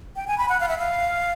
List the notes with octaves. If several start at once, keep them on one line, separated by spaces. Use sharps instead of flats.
G5
G#5
B5
F#5
F5
E5
F5